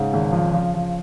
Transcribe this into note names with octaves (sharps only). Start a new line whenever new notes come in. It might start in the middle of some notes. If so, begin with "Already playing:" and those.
Already playing: G#2 C#3
G#1
F3
F3
F3